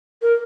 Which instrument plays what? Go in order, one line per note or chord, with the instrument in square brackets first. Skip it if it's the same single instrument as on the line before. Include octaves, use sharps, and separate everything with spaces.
[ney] A#4